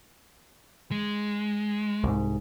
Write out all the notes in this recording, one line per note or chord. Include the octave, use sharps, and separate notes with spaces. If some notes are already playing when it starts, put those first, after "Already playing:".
G#3
C2 G#2